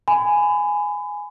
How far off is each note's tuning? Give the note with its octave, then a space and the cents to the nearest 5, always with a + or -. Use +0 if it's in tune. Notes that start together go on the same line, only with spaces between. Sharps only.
G#5 +0 B5 +30